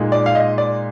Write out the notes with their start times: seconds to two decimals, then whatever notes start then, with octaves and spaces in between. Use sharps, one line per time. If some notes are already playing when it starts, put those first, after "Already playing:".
Already playing: A#2 G#3 D#4
0.12 D5
0.26 F5
0.35 D#5
0.58 D5